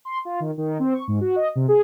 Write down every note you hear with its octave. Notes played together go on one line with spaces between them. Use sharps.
C6
F4
D#3
D#3
C4
C#6
G#2
F#4
D#5
C3
G#4